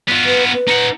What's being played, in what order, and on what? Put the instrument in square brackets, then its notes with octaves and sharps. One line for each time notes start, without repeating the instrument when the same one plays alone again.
[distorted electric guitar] B3 F4
[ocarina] B4
B4
[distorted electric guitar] D#4 F#5